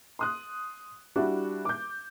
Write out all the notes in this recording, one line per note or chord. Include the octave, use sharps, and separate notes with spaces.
C6 D#6 F#6
G3 D4 E4 F#4
D6 G6